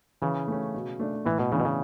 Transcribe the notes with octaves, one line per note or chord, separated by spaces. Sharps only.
C#3 E3
A3 C#4
B2
A3 D4
A2 E3
B2
C#3 E3 B3 D4
B2
C#3